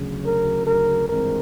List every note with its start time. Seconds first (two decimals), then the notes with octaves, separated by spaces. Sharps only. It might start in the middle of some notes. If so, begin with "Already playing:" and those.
Already playing: D2 C#3 F#3
0.24 A#4
0.66 A#4
1.08 G#1 G2 E3 G#3 C4 A#4